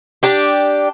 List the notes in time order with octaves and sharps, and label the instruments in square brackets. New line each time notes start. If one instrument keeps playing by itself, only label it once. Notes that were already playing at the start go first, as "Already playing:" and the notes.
[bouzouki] D4 G4